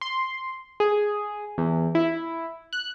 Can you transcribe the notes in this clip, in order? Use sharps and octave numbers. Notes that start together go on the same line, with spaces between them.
C6
G#4
E2
E4
F#6